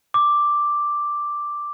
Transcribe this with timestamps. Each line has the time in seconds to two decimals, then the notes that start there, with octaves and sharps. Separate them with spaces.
0.14 D6